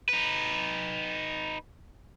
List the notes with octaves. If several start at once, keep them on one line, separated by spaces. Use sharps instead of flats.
D#4 B4